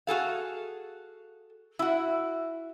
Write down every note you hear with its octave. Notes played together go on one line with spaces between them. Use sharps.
F#4 G#4 A4 F5
E4 F#4